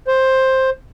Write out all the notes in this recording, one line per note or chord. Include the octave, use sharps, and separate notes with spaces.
C5